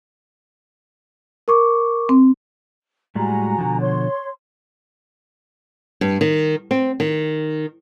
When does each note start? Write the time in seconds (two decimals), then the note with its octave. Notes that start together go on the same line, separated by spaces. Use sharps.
1.48 A#4 C#6 D6
2.09 C4
3.15 A2 G3 G#3 F#4 G#5 A#5
3.58 B2 D3 F3
3.80 C#5 C6
6.01 G2
6.21 D#3
6.71 C4
7.00 D#3